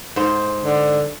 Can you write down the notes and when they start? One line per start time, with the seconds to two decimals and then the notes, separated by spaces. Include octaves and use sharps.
0.16 G#2 C5
0.64 D3